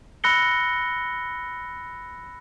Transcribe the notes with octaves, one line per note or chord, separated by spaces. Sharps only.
B5 E6 F#6 A#6 C#7 G7